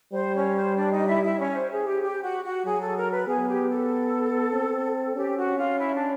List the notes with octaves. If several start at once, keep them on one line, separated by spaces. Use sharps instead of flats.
G3 C5
C#4 C#5
C5
D4 D5
D#4 D#5
E4 E5
E4 E5
C#4 C#5
C5
G#4
G4
G4
F#4
F#4
F#3 G#4
A4
A#4
B4
B3 G#4
G4
A4
C4
C#4 G4
F#4
F4
E4
D4